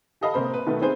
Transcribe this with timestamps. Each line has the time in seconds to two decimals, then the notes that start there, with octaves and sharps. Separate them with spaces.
0.21 G4 A4 D#5 F5 A5 B5
0.34 C3 A#3 C5 B5
0.54 B4
0.67 B2 D#3 A3 B3
0.82 C4 D#4 G#4 B4 C5